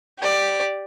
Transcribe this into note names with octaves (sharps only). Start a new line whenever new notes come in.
G4 D5